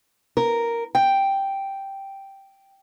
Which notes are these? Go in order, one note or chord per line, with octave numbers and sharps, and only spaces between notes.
A#4
G5